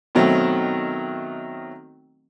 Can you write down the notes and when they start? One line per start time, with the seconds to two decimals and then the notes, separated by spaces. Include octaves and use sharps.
0.15 B2 D#3 F#3 A3 C4